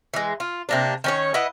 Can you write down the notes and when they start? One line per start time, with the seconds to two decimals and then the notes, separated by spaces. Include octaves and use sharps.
0.14 E3 G#3
0.40 F4
0.69 C3 A#3 D4
1.04 D#3 C#4 C#5
1.34 E4 B4 D#5 F#5